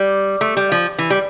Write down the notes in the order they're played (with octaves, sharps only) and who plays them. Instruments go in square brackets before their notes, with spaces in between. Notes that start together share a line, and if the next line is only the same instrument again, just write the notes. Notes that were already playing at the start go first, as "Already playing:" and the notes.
Already playing: [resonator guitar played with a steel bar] G3
A3
G3
F3
E3
G3